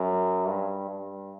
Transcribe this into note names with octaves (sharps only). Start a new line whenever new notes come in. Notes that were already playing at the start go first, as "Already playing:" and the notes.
Already playing: F#2
G2
G2